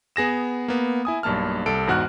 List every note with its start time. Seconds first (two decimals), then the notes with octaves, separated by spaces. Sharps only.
0.16 B3 G#4 A#6 E7
0.68 A#3 B3
1.05 E4 G#5 D#6
1.23 B1 G2 A#3 A5 F6
1.66 C2 A4 D7
1.87 E2 G#2 F#4 F6 F#6